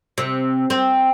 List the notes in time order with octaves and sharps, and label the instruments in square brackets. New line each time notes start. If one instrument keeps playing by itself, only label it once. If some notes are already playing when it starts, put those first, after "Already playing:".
[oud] C3
C4